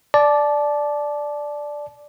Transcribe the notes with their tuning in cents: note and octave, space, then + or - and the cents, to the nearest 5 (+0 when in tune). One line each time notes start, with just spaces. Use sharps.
D5 +0 A5 -25